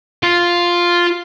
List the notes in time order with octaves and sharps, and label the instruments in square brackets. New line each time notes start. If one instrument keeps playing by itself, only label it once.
[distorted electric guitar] F4